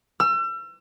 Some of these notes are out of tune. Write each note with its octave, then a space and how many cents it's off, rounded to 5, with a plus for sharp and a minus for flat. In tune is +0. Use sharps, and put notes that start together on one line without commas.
E6 +40